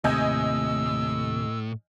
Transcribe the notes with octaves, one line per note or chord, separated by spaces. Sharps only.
D#2 A2 C3 D#5 G#5 E6 G6